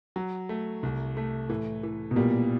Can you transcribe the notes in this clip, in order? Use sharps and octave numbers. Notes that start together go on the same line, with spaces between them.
F#3
A3
C2
A3
A2 E3
E3
B2
A#2 G3